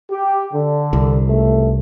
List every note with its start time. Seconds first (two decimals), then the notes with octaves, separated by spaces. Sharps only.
0.10 G4
0.53 D3
0.93 C2
1.27 C#2 A3